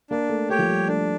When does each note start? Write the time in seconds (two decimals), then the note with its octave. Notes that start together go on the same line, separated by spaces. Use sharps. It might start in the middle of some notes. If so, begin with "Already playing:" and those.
0.10 A#3 D4
0.29 A3
0.49 A3 G4 C#5 G5
0.59 F3
0.69 G3
0.88 A3 D4